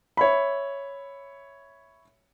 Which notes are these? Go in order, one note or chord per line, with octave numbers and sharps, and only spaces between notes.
C#5 E5 B5